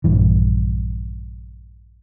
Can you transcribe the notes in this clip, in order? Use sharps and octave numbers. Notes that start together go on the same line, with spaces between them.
A#1 G2 E3